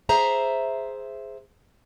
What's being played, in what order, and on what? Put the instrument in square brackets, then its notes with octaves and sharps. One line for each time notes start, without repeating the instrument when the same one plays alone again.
[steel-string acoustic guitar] G#4 C5 E5 A#5